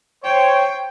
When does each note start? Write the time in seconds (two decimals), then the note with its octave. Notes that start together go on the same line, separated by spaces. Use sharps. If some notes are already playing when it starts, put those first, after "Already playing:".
0.25 C5 C#5 G5